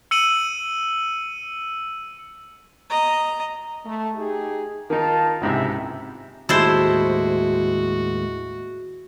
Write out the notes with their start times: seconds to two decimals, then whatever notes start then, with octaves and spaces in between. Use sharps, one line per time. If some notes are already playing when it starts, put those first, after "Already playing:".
0.11 E6 C#7 D#7 F#7
2.89 D#5 A#5
3.85 A3
4.15 D#4 G4 G#4
4.90 D#3 D#4 F4 F5 A5
5.41 C#2 G#2 C3 E4 E5
6.49 D#2 A2 G#3 E4 F#4 A4 C5